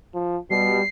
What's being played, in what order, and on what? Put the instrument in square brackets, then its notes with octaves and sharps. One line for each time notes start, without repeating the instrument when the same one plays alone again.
[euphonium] F3
[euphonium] B2 [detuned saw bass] G3 [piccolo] C7